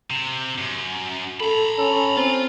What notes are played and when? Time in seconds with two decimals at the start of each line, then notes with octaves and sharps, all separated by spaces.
0.10 C3
0.58 F#2
1.40 A4 A#5 B5
1.78 C#4 A4
2.17 C4 F4